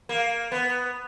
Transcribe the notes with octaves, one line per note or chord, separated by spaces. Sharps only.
A#3
B3